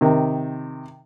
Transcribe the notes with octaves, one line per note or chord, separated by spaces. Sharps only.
C3 D#3